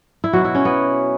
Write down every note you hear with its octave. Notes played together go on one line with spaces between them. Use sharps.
E4
B2 F#3 F#4
E4
C#4
B3